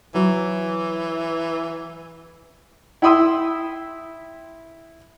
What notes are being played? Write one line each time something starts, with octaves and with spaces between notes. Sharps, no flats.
E3 F#3
E4 G5 B5 C6 D#6 E6